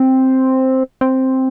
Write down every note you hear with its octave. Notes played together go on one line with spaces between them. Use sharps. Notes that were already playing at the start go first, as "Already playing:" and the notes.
Already playing: C4
C4